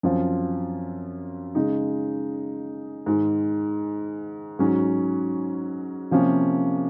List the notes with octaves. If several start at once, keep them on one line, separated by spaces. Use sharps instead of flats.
F#2 F3 C4 F4
C#3 G#3 D#4
G#2 D#3 G#3
G#2 F#3 C#4 F#4
C3 F3 A#3 C#4